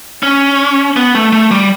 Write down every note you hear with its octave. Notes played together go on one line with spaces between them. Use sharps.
C#4
B3
A3
A3
G3